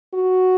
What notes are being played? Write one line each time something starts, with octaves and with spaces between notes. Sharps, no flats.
F#4